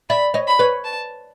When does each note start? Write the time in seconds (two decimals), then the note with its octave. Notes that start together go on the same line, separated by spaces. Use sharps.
0.09 D5 E5 B5
0.34 C#5 D#5
0.47 B5
0.59 B4 C#5
0.84 A5